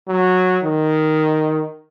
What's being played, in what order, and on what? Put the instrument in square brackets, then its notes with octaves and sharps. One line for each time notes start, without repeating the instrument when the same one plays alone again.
[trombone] F#3
D#3